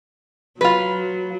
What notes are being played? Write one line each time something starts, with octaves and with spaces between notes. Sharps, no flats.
F#3 F4 B4